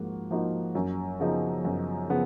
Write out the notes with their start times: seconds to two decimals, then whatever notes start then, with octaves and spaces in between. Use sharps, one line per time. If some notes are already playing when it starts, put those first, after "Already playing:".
Already playing: G#2 F3 A#3 F#4
0.30 F3 A#3 D#4 F#4
0.75 F#2
1.20 C#3 F3 B3 D#4
1.65 F#2
2.10 C#3 F3 B3